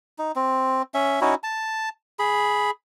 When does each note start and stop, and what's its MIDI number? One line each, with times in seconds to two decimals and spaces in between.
0.18 0.32 63
0.36 0.82 60
0.94 1.20 61
0.94 1.20 76
1.21 1.35 61
1.21 1.35 63
1.21 1.35 64
1.21 1.35 66
1.43 1.89 81
2.19 2.71 68
2.19 2.71 83